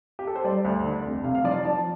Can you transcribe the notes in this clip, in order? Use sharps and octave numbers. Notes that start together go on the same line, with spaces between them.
G4
A4
C5
G3 D5
D2
D3
F1
C3 F5
F5
F3 D5
D5
F3 A5